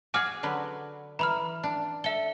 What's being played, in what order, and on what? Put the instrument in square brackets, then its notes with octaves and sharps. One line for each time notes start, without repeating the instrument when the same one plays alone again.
[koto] F#4 G#4 [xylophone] G#5 D6 F6
[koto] D3 F#3 B4
[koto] E3 [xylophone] A#5 B5 F6
[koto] D4
[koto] A4 [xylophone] E5 G7